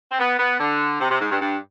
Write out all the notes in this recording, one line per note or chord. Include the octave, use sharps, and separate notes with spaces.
C4
B3
B3
D3
C3
C3
G#2
G2
G2